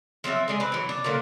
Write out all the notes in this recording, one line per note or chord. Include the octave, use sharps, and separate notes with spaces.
F3 F#3 C4 E5
G#3 D4 G#4
C4 B4
E3 F#3
D4
A#2 D3 F#3 A#3